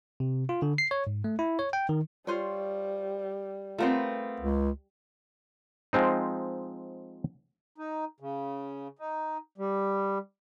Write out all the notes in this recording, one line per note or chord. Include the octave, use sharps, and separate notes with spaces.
C3
F4
D3
C7
C#5
G#2
A3
E4
C#5
G5
D#3
G3 F4 C5 C#5
A3 B3 C4 F4 A#4 C5
C#2
F3 G#3 C4 D#4
D#4
C#3
D#4
G3